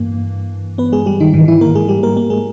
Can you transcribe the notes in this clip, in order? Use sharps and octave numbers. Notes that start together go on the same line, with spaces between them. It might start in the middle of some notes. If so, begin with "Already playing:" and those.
Already playing: G2 E3 A#3
B3 B4
G#3 G#4
G3 G4
D#3 D#4
G#2 D#3 E3 D#4
E3 E4
A#3 A#4
G#3 G#4
G3 G4
A#3 A#4
A#3 A#4
G#3 G#4